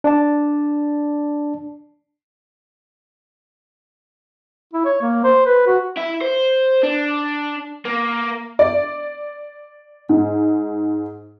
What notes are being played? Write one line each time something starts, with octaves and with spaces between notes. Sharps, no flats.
D4 D5 A5
E4
C#5
A#3
C5
B4
F#4
E4
C5
D4
A#3
D5
G#2